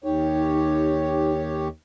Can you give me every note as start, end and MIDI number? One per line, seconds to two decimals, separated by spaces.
0.04 1.68 39
0.04 1.33 63
0.04 1.68 67
0.04 1.68 73